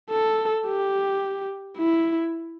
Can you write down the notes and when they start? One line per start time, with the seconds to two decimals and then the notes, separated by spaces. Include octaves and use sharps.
0.10 A4
0.66 G4
1.78 E4